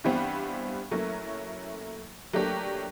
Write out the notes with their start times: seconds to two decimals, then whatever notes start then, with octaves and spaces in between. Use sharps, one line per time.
0.04 G2 E3 G3 B3 C4
0.91 F#3 A3 A#3 C#4 E4
2.33 F#3 A3 A#3 D4 G4